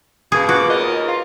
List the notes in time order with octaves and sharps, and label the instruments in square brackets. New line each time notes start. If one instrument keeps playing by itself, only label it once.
[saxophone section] B2 A#3 [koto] G#4
[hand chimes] F4 B4 [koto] F#4 [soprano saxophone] D6
[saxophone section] D#2 C#3 A#4 [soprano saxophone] D#5
[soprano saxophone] F4